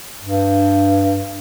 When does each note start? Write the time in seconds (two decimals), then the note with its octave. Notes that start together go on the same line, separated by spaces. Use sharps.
0.23 G2